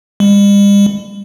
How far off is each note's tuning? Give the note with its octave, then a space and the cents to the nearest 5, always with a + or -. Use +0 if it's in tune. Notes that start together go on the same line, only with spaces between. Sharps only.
G3 +45